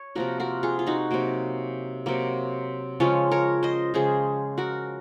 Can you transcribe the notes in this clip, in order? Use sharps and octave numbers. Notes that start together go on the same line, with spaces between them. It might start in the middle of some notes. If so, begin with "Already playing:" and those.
Already playing: C#5
C3 F3 A#3 F#4 A#4
F#4 A#4
F4 G#4
F4
D#4 F#4
C3 F#3 A#3
C3 F#3 A#3
C#3 F3 G#3 C#4 F4
A#4 C#5
C5 D#5
C#3 F3 G#3 G#4 C5
F#4 A#4